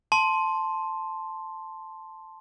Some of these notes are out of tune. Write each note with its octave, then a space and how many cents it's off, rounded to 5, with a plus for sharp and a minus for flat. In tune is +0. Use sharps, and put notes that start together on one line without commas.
A5 +0 C6 +0